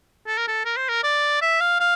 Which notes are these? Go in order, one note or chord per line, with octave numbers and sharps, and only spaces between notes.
A4
A#4
A4
A#4
C5
A#4
D5
E5
F5
F5